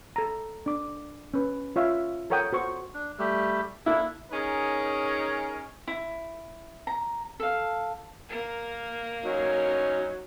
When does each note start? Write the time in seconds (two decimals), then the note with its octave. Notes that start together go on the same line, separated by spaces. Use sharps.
0.16 A4 A#5
0.66 D4 D6
1.34 C#4 B4
1.76 F4 C#5 E5 F5
2.30 A4 A#4 C#5 F#5 G5 D#6
2.52 F#4 C5 C#6
2.94 D4
3.19 G3 A3 G4
3.86 A#3 D4 E4 A4
4.32 C#4 D#4 G#4 A#4 C#5
5.87 E4
6.87 A#5
7.40 A4 F5
8.29 A#3 A#4
9.24 F#3 C#4 D#4